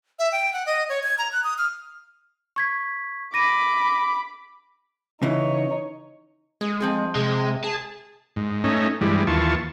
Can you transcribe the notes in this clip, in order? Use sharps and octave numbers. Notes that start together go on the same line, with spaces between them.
E5
G5
F#5
D#5
C#5
G#6
A#5
F#6
D#6
F6
C#6 G#6 B6
B5 D6 A#6 D#7
C#3 E3 D#4 C#5
G#3 G#4
F3 C4 G#4
C3 G#3
G#4 A5
G#2
A3 C#4 D#4
G2 E3 G3 G#3
D#2 E3 F4 A5 C#6